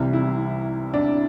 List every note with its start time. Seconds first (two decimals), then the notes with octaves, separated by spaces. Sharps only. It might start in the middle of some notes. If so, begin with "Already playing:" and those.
Already playing: C2 C3 E3 G3
0.13 E4
0.94 D4